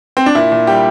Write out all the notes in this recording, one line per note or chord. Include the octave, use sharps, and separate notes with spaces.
C4
D4
A#2 E4
A#2
G3 G4